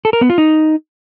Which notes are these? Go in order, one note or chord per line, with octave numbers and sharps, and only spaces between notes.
A4
A#4
B3
F4
D#4